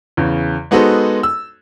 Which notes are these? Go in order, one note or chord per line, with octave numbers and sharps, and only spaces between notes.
E2 C#3
G#3 B3 D#4 F#4 A4 C5
E6